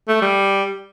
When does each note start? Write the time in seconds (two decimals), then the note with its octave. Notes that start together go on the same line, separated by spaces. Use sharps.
0.08 A3
0.22 G3